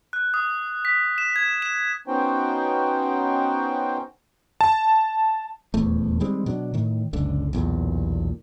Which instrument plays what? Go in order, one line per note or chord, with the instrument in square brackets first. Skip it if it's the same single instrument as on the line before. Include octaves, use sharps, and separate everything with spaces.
[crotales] F#6
D#6
B6
E7
G#6
E7
[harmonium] B3 C#4 D#4 F#4 C5 G5
[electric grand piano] A5
[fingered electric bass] D#1 E2 A3
D#3 G3 G#3 C4
B2 F#3 D4
A2 D#3
F#1 C#2 D3
B1 E2 A#2